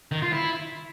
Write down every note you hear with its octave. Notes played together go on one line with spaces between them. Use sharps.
D#3
F4
E4